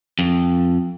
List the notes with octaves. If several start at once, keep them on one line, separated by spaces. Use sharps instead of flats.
F2